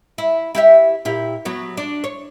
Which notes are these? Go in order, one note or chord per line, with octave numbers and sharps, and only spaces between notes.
E4
E4 G4 E5
A#2 E4 G4
F#3 B3
D4
C#5